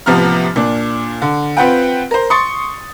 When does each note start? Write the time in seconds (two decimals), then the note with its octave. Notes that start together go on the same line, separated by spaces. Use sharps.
0.06 A1 C3 F3 B3 A#5 F6
0.56 A#2 D4
1.22 D3
1.57 C4 F4 B4 F#5 G5
2.11 A#4 C5
2.30 C6 C#6 D#6 A6 C#7